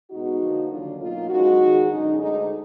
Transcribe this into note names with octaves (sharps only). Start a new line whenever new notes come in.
B2 G#3 B3 D#4 F#4
D3 F3 A#3
D#2 D3 F#3 A#3 D4 F4
B2 F#3 A#3 D#4 F4
F#2 F3 G#3 D#4 F#4
G#2 D#3 G#3
F#2 D3 G#3 D#4
D2 D3 G#3 D#4